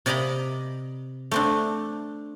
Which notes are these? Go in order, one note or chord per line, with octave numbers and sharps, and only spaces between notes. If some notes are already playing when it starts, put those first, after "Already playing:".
C3 D5 D#5 A#5 B5
A3 C4 D4